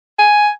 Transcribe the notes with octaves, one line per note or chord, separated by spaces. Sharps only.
G#5